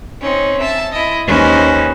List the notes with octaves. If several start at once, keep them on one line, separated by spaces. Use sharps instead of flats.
C4 C#4 D#4
E5 A5
E4 D#5
D#2 C#4 D#4 B4 C5 G#5